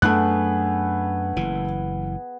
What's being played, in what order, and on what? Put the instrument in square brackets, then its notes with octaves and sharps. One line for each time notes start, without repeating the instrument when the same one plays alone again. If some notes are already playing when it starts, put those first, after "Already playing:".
[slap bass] F#2 D4 [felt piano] A3 F#6 [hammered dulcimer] B3 G#4 B4
[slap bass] F#1 E3